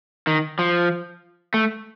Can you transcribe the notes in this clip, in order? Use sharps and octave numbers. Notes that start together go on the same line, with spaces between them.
D#3
F3
A3